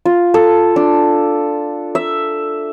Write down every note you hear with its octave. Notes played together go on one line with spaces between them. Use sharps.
F4
A4
D4
E5